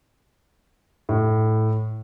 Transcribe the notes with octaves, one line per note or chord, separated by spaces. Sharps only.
A2